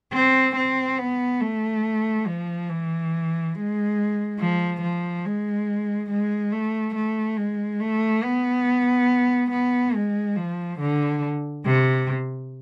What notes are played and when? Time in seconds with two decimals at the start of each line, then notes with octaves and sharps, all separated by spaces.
0.12 C4
0.56 C4
0.98 B3
1.40 A3
2.26 F3
2.69 E3
3.54 G#3
4.39 F3
4.81 F3
5.25 G#3
6.10 G#3
6.52 A3
6.95 A3
7.37 G#3
7.80 A3
8.23 B3
9.51 B3
9.94 G#3
10.36 F3
10.80 D3
11.65 C3